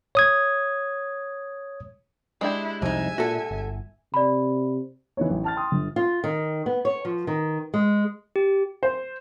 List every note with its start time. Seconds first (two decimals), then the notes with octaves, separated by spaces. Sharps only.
0.15 C#5 D#6 G#6
2.41 G#3 D4 E4 G4
2.82 C2 F2 D#4 E5 G#5
3.18 A#2 F#4 A4
3.51 G1
4.14 C3 D5 B5
5.17 E3 B3 D#4 C#5
5.30 A1
5.44 A5 F6 A6
5.56 G5 C6 D#6
5.72 G1
5.96 F4
6.24 D#3
6.66 B3
6.85 C#5
7.05 F3
7.27 D#3
7.74 G#3
8.36 G4
8.83 C5